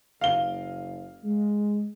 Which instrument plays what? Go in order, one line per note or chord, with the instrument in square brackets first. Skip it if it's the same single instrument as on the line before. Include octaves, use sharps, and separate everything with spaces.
[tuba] F#1 [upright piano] F5 G7
[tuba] G#3